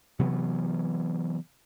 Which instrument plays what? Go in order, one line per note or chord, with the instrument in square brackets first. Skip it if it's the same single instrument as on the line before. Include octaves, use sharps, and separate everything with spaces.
[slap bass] C3 E3 F#3 B3